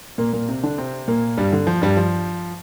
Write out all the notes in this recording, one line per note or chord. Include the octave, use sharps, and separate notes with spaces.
A#2 A#3
A#2 A#3
C3 C4
D3 D4
C3 C4
A#2 A#3
G2 G3
D3
F3
G2 G3
F3